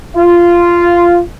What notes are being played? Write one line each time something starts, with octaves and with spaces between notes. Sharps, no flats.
F4